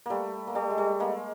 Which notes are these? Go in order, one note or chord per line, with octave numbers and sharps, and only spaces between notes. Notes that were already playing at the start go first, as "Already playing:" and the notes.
G3 A3 A#3
A#3
G3 A3
G#3
G3 A3
G#3 A#3